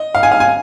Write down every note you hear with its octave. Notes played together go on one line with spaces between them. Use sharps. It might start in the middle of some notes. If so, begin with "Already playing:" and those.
Already playing: D#5
F5
G#5
F5
G#5